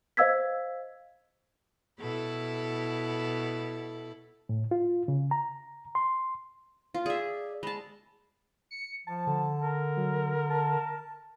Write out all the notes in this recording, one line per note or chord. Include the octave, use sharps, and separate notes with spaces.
C5 D#5 F5 E6 G#6 B6
B2 E4 A4
A2
F4
C#3
A#5
C6
F4
G#4 D5 E5
G#3 A5 B5
C#7
F3 A5
D3
A#4
F#3
A5